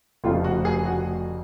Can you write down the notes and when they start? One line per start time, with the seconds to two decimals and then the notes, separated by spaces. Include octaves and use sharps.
0.24 F1 F2 C#3 F3 A3 F4
0.44 F#4
0.65 G#4
0.85 F#4